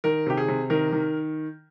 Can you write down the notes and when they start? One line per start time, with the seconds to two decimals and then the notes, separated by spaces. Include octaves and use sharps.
0.04 D#3 A#4
0.27 C3 G4
0.37 G#4
0.48 C3
0.70 D#3 A#4
0.92 D#3